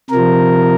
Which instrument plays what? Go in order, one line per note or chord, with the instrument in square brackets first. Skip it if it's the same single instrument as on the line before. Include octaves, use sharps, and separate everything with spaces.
[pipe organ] C3 F3 A#4